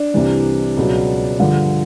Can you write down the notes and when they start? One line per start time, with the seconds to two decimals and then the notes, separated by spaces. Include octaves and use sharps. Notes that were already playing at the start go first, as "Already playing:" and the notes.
Already playing: D4
0.14 C2 C3 E3 G3
0.77 C#2 B2 F#3
1.40 G2 D3 F3